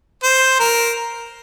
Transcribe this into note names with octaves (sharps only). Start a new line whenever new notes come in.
C5
A#4